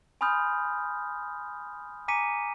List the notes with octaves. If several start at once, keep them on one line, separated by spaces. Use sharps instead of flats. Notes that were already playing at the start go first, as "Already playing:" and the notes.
G#5 B5 C6 D#6 F6 G6
G#5 A#5 D6 B6 C#7 D#7